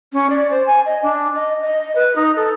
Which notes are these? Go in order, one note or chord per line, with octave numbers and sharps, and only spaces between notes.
C#4
D5
C5
G#5
D#5
D4
D#5
D#5
B4
D#4
A4